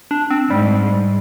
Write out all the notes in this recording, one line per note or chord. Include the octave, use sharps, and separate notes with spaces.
D4
C4
G#2 G3